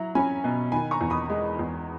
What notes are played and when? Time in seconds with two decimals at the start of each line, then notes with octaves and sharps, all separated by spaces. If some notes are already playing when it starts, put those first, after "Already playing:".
Already playing: F#3 E4 A#5
0.15 C#4 G#5 B5
0.44 B2
0.72 D#3 G#5 B5
0.91 A#5 C#6
1.01 E2
1.10 B5 D#6
1.30 G#3
1.59 E2